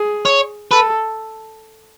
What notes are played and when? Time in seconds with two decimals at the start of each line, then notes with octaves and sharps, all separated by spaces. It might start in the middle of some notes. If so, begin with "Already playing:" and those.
Already playing: G#4
0.26 C#5
0.71 A4 B4